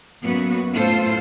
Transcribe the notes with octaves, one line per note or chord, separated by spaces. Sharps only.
F#2 A#3 B3 F#4 B4
A2 F4 A4 C5